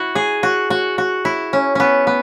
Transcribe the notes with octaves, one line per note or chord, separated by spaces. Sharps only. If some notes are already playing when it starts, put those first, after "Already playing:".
Already playing: E4 F#4
G#4
F#4
F#4
F#4
E4
C#4
B3 C#4
B3